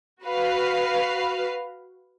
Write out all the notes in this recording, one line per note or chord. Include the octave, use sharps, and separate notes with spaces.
F#4 B4 F5